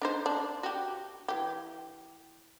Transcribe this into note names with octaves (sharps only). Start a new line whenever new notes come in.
D4 D#4 C5
D4
F#4 G4
E3 G4